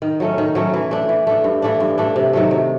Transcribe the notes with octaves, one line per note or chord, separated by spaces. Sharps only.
D#3
F#3 A3 C#4
D#3
F#3 A3 C#4
E3
A3 D4
E3
A3 D4
G2
E3 A3 D4
G2
E3 A3 D4
C3
D#3 F#3 A3
C3